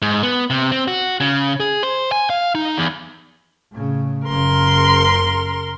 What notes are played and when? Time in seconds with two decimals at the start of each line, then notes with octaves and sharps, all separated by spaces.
0.02 G#2
0.23 B3
0.50 C3
0.72 C4
0.88 F#4
1.20 C#3
1.60 G#4
1.83 C5
2.12 G#5
2.30 F5
2.55 D#4
2.78 E2
3.72 A2 C#3
4.27 F#1 C#3 A#4 C6